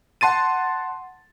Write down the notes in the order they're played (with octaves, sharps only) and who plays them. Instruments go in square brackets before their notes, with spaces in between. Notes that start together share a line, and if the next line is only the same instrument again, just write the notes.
[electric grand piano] F#5 A5 C6 A6 D#7